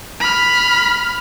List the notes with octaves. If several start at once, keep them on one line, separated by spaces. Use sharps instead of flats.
B5 F6